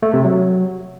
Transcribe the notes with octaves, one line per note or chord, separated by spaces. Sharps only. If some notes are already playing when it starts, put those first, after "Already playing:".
A3
C3
F#3